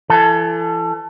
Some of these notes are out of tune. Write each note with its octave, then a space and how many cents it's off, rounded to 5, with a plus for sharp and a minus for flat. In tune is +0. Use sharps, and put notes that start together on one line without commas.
E3 +35 A4 +0